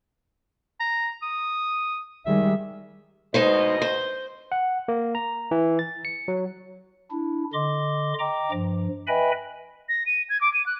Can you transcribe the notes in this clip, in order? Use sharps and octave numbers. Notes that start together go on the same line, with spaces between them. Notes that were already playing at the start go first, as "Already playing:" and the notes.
A#5
D#6
D#3 G3 G#3 E5
D2 B2 G#3 D#4 C5 D#5
C5
F#5
A#3
A#5
E3
A6
C#7
F#3
D4 E4
D3 D#5 C6 D6
D#5 G5 A#5 D6
G2 F3
B4 D#5 E5 G5 G#5 B5
A#6
D#7
G#6
D6
D#7
F#6